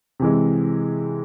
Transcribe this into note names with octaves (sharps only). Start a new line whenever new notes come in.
C3 E3 G#3